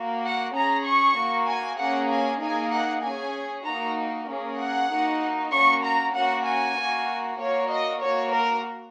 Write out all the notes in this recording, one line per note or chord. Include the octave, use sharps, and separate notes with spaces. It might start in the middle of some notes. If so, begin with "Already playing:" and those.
Already playing: A#3 F#4
F#5
C#4 G#4 A#5
C#6
A#3 F#4
G#5
A#3 C#4 G#4 F#5
G#5
A#3 D#4 G#4 G#5
F#5
C#4 G#4 G#5
A#3 D#4 F#4 A#5
A#3 C#4 G#4
F#5
A#3 D#4 F#4
A#3 C#4 F#4 C#6
A#5
A#3 C#4 F#4 F#5
G#5
A#3 F#4
A#3 F#4 C#5
D#5
A#3 F#4 C#5
A#4